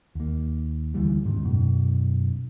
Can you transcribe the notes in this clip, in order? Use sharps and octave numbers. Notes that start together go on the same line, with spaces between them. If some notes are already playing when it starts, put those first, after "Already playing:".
D#2 A#3
D2 E3 G3
D#2 G#2 C#3
F#2 B2